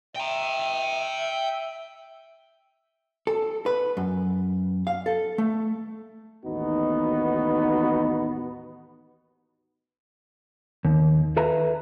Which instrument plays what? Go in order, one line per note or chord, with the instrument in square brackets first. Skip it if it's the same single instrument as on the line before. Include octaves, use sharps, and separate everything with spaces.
[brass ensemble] E5 [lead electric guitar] G5 A#5
[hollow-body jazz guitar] A4
B4
F#2
F5
A4
A3
[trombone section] A1 D#2 B3 D#4 F#4
[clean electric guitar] D#2
A4 B4 E5 A#5